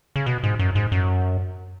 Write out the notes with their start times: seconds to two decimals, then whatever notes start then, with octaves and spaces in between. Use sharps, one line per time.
0.16 C#3
0.26 B2
0.43 G#2
0.59 F#2
0.75 G#2
0.92 F#2